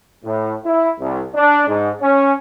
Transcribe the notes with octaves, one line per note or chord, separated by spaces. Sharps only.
A2
E4
C2
D4
G#2
C#4